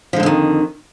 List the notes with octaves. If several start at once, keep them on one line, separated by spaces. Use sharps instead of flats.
F2 G#2 D3 D#3 F3